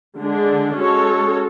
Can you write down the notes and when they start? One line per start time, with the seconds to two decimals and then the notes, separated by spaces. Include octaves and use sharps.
0.17 D3 G#3 D4 G#4
0.76 G#3 C#4 F#4 A4 C#5